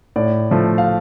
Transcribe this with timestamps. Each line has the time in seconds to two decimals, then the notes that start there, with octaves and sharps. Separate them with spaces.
0.16 A2 D5
0.51 F3 A3
0.78 F5